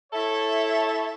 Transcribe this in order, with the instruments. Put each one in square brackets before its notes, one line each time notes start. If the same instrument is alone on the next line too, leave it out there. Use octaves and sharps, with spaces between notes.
[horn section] E4 A4 C#5 [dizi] E5